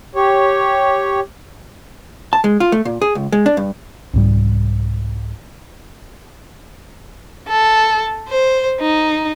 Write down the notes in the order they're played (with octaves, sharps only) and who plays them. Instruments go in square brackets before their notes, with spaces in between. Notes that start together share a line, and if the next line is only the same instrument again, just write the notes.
[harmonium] G4 C#5
[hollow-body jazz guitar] A5
G#3
F4
A3
A#2
G#4
C#2
G#3
D4
G2
[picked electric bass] C2 G#2 G3
[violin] A4
C5
D#4